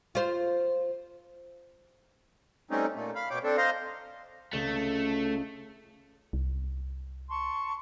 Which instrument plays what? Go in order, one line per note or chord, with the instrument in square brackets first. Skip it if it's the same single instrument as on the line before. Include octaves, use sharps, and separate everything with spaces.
[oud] F4 C5
[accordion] G3 A3 C4 C#4 D#4
A#2 A3
F5 B5
B2 C#5 G5 D6
C4 D4 A4
C5 D#5 F5 A#5 C6
[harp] C#2 [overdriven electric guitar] A3
[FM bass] C2
[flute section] A5 C6 C#6